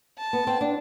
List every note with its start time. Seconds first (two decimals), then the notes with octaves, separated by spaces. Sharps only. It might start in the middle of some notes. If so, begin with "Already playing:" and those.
0.18 A5
0.33 B3
0.47 C4
0.61 D4